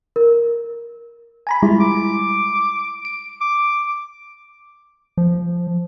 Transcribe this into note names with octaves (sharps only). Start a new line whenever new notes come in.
A#4
G#5 A#5 B5
G3 G#3 E4 F4
D6
D7
D6
F3